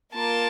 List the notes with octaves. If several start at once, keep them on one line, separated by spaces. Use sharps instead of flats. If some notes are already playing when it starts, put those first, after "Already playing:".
A#3 F4 A#4 A5